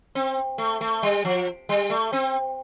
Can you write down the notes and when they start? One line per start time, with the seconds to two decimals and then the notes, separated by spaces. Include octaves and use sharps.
0.15 C4
0.58 A3
0.81 A3
1.03 G3
1.25 F3
1.69 G3
1.90 A3
2.13 C4